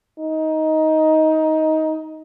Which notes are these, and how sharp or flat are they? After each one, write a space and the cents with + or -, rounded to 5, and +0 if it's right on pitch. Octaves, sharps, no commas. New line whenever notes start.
D#4 +15